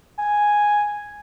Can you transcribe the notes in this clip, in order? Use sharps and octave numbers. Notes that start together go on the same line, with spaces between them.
G#5